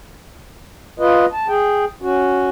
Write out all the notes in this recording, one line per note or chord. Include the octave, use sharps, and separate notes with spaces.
F4 B4 D#5
A5
G#4 G5
C#4 F#4